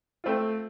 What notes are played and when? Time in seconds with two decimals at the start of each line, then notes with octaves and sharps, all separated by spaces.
0.24 A3 C4 F4